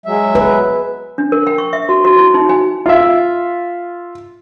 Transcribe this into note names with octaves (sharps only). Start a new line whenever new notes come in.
F#3 G#3 E5
B4
D4
A#4
G5
C#6
E5
F#4
F#4
E4
D#4
G#5
F4 E5